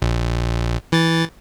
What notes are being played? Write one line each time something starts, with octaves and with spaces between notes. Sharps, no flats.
A#1
E3 A6